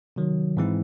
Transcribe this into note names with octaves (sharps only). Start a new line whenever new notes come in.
C3 D#3 F#3
G#2 E3 G#3 C4 E4